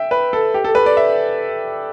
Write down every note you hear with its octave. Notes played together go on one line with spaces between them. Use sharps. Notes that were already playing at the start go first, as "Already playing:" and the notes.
Already playing: E5 G5
B4
A4
G4
A4
B4
D5
E5